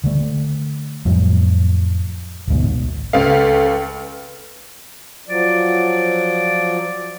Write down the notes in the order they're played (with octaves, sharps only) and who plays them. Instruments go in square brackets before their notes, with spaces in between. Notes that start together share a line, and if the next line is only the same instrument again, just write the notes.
[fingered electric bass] D3 A3
F2 A2 F#3
A1 D2 G#2 B2
[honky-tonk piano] C#2 F5 [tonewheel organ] A4 B4
[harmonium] F3 F#3 [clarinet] D5